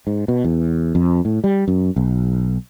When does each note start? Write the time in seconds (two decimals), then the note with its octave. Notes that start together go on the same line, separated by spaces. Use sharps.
0.07 G#2
0.28 B2
0.44 E2
0.95 F2
1.25 A2
1.44 G3
1.68 F#2
1.96 B1